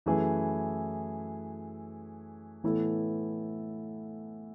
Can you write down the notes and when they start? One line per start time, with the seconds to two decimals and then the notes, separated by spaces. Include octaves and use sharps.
0.06 F#2 E3 A3 E4 G#4
2.64 A2 E3 B3 E4 A4